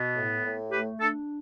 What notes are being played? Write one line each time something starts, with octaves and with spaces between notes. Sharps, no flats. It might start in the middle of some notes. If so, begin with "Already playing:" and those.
Already playing: B2 B3
A2
A2
A3 G4 B4
D4 A4